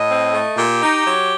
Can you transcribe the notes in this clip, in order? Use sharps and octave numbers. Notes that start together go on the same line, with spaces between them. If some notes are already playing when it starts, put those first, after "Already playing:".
Already playing: A2 D#5
C4
A3
A#2 G4
D#4
F#3